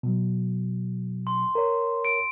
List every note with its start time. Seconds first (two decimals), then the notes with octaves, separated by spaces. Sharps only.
0.03 B2 F#3
1.27 C6
1.55 A#4 C#5
2.05 D7